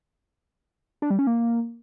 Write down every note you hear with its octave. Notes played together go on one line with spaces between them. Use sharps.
D4
G3
C#4
A#3